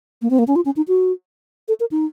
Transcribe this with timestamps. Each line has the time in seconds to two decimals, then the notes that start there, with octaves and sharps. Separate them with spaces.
0.22 A#3
0.30 C4
0.39 A#3
0.47 C#4
0.56 F4
0.65 C#4
0.77 D#4
0.88 F#4
1.68 A4
1.80 A#4
1.91 D#4